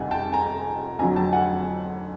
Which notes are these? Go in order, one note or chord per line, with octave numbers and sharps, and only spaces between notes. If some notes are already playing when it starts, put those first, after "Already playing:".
Already playing: F2 C3 D#3 G3 F#5 G#5
G5 A5
G#5 A#5
F2 D3 F#3 G#5 A#5
G5 A5
F#5 G#5